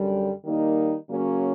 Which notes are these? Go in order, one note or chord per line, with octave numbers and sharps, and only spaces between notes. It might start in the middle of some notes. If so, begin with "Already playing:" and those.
Already playing: F#2 D3 G3
D#3 G3 A#3 D#4
C#3 F#3 A#3 C#4